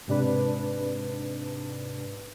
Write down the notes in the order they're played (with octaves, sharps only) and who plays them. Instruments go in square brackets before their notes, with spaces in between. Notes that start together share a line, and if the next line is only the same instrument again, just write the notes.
[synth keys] G#2 C3 D4 B4